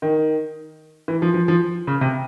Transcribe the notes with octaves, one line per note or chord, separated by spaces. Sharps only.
D#3
E3
F3
F3
F3
C#3
C3